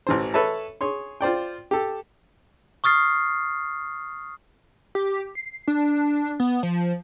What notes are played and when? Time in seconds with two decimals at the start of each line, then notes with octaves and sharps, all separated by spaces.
0.07 A1 E3 C5
0.34 A4 B4 C#5 E5 A5
0.81 G#4 C#5 C6
1.21 F4 C5 D5 G5
1.71 G4 A4
2.84 C#6 D#6 F6 A6 C7
4.95 G4
5.35 C7
5.68 D4
6.40 B3
6.63 F3